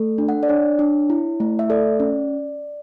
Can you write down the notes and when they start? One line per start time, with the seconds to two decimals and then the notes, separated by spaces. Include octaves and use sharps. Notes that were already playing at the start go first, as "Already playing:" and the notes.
Already playing: A3 A4
0.18 D4
0.29 F#5
0.43 D5
0.48 D4 C#5
0.79 D4
1.10 E4
1.40 A3
1.59 E5
1.70 A4 D5
2.00 C#4